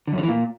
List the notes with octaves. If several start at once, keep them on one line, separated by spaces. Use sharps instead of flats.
D3
F#2
D3
E3
A#2